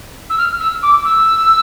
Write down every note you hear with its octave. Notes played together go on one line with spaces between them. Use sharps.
E6
F6
E6
D6
E6